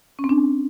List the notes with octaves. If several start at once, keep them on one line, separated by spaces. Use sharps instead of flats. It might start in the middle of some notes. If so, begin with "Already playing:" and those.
C#4
C4
D4